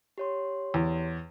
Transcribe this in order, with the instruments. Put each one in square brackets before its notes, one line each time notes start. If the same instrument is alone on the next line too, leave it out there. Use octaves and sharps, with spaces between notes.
[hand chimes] G4 C#5 C6
[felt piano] E2